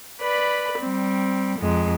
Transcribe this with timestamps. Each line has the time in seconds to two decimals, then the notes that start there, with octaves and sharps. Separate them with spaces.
0.21 B4 D5 B5
0.79 G3 C4
1.58 F2 G#3